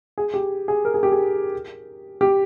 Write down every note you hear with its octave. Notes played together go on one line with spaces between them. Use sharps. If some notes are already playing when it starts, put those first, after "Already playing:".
G#4
G4
G#4
A#4
G#4
G4
G#4
G4